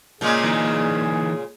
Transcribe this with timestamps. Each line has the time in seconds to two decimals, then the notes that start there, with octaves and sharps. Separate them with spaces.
0.21 A#2 C#3 G#3 A#3 G#4
0.43 E3 D#4